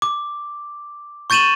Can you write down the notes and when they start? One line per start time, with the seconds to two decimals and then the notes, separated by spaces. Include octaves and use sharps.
0.02 D6
1.30 C#6 G6 A6 D#7 E7 F#7